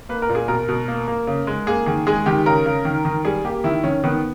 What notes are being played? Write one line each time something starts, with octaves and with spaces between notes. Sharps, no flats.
A#3 B4
A#4
A#2
G#4
B2 A#4
B2
A#3
A#3
C#3
G#3
A#3 G#4
D#3 G#4
G#3 G#4
D#3 G4
C#3 A#4
C#3
D#3
D#3
G3 G#4
A#3 G4
D#3 E4
D#3 C#4
D#3 B3